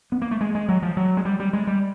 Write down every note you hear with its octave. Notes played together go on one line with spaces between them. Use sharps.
B3
A#3
A3
G#3
G#3
F#3
F3
F#3
G#3
G3
G3
G#3
G3